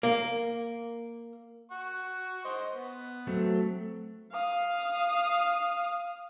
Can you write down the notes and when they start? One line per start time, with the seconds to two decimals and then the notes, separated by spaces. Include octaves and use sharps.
0.03 A#3
1.71 F#5 C#6
2.44 C5 D#5
2.75 B3
3.27 F#3 A3 C4
4.33 F5 D#6